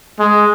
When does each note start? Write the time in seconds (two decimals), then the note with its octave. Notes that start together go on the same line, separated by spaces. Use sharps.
0.19 G#3